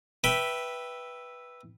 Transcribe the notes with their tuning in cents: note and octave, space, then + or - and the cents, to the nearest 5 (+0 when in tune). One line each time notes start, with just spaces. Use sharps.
B4 -5 E5 +0 G5 +0